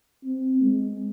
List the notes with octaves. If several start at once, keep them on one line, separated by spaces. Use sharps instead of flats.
C4
G#3